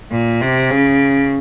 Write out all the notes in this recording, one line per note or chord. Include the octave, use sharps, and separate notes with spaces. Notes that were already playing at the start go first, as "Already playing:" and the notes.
A#2
C3
C#3